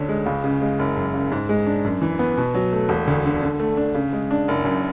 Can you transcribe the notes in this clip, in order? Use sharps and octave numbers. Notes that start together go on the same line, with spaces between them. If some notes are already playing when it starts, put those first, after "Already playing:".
Already playing: D2 D3 C#4
G#3
C#2
C#3
G#3
F#1
F#2
C#3
G#2
G#3
D4
F#2
E3
B3
B2
F#3
A3
E1
D2
D3
D3
A3
D4
C#3
G#3
D4
F#1
F#2